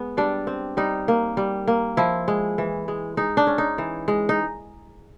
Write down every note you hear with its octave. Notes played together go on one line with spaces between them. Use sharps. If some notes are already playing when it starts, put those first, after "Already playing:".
Already playing: G#3 B3
G3 D4
C4
G3 D#4
A#3
G3
A#3
F3 E4
G#3
E3
G#3
G#3 D#4
D4
C#4
D#4
E3
G#3
D#4